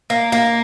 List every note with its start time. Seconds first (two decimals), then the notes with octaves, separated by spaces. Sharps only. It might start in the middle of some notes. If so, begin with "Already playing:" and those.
0.10 A#3
0.32 A#3